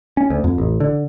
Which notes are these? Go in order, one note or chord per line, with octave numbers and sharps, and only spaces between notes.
C#4
D2
F2
A1
D3